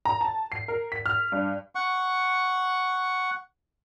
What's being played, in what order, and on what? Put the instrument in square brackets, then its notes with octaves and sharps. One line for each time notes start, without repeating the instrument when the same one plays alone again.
[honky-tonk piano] A#5
A5
C7
A#4
B6
F6
G2
[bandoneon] F#5 C#6